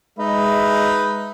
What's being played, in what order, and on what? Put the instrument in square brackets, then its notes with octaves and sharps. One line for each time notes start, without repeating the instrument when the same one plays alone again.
[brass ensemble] G#3 E5 [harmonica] D#4 B4